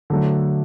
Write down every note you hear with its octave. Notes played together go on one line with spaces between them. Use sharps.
D3 F#3 A3